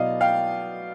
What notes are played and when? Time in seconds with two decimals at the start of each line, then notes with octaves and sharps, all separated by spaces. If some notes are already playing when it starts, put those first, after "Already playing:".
Already playing: B2 F#3 B3 E4 D5 D#5 F5
0.21 F5 G5